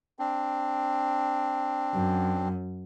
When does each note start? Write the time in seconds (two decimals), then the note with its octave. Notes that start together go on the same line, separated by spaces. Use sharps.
0.19 C4 D4
1.94 F#2